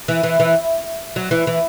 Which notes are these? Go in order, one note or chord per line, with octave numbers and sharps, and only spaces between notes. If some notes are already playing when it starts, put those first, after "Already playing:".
E3
E3
E3
F#3
E3
E3